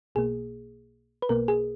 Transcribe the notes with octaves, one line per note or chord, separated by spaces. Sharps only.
B1 B2 A#3 G#4
B4
B1 B2 A#3 A#4
G#4